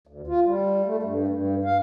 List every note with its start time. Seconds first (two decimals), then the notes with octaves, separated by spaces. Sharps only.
0.07 D2
0.27 F4
0.45 G3
0.86 A3
1.03 G2
1.27 G2
1.65 F5